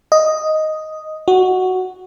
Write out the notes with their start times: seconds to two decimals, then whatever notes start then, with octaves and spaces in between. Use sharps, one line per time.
0.12 D#5
1.28 F#4